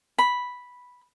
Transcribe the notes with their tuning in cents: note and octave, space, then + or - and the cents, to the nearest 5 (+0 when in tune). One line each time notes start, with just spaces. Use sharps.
B5 -5